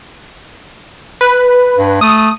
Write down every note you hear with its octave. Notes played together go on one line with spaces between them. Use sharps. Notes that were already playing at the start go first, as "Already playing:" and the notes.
B4
G2
A3 D#6